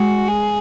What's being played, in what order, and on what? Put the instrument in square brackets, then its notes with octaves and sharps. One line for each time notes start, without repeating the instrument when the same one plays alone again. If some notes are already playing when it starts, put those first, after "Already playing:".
Already playing: [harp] G#3 [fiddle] F#4
[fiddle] G#4